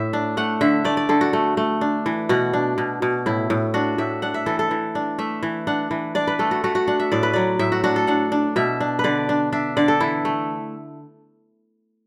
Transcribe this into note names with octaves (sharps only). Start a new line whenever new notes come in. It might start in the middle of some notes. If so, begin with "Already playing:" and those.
Already playing: A2 E5
D4
A3 F#5
D3 E5
A3 D5
D5
D3 A4
F#4
A3
A3
D4
E3
B2 F#4
D4
B2
B2
A2 E4
A2
D4 F#4
A2 E5
D4 F#5
E5
E3 A4
A4
E3
D4
A3 E5
E3
D4 F#5
E3
D4 D5
B4
A3 A4
F#4
A3 F#4
F#4
D4 F#5
E5
A2 D5
B4
F#3 D5
A2 E5
F#4
D4 F#4
A4
D4 F#5
D4
B2 E5
D4
B4
D3 D5
D4
D4 E5
D3 D5
A4
E3 E4
A3